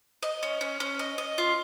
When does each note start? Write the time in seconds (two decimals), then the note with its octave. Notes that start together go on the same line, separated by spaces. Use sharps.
0.23 D#5
0.43 C#4
0.61 C#4
0.80 C#4
0.99 D#5
1.18 D#5
1.38 F4